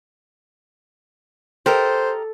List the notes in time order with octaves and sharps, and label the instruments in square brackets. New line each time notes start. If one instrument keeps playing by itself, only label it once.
[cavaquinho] G4 A#4 D#5 [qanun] A4 [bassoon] C5